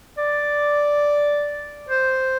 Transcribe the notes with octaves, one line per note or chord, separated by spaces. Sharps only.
D5
C5